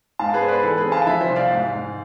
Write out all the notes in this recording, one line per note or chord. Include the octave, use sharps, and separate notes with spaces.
G#2 F5 A5
G#4 B4
B3 C5
B4 D5
E3 A4
G#4 B4
C4
F5 A5
F3 E5 G#5
C5 E5
C2
D5 F5
G#2
G#2